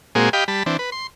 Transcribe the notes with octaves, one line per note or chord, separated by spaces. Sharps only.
A#2 G#3 A#3 C4 F#4 G#4
G4 D#5 F5 G5 B5
G3 A5 B5
E3 C4 D4
B4
C6